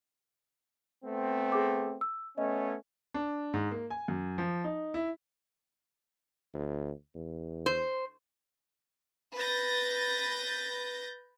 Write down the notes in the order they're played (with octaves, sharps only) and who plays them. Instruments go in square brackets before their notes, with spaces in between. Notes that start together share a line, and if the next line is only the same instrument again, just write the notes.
[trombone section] A3 B3 C4
[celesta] G#4 D6
E6
[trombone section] A3 B3 C#4 [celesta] D#5
[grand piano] D4
G#2
A#3
G#5
F#2
F3
D#4
E4
[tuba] D2
E2
[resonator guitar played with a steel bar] C5
[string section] B4 G6 A6 A#6